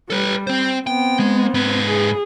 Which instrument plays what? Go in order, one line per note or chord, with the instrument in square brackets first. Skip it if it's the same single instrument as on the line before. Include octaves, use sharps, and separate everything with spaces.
[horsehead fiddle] G3 [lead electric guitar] A4 B4
[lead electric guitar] C4 C5
[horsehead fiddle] B3 C4 [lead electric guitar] G5
[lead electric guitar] G#3
G#2 B4
[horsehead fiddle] G#4